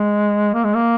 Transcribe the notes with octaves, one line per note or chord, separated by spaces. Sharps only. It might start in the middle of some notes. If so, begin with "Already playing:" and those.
Already playing: G#3
A#3
G#3
A#3